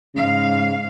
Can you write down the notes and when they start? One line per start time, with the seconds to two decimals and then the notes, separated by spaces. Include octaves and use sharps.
0.15 G#2 C#3 F5